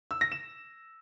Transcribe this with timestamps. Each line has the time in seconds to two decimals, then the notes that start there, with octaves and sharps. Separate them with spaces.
0.11 E6
0.21 A#6
0.32 E7